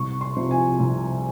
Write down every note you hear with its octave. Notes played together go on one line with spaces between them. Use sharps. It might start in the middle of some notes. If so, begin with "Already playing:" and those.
Already playing: C2 C#6
C6
C3 F3
G#5
C2